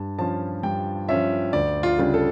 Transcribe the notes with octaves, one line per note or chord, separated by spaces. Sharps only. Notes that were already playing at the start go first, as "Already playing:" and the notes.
Already playing: G2 A5
F3 C#4 F4 A5
G2 G5
F3 C#4 F4 E5
D2 D5
F4
C#3 G3 D4 F4
A4